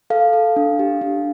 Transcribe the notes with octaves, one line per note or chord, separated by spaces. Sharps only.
A4 F5
A4
D4
G4
D4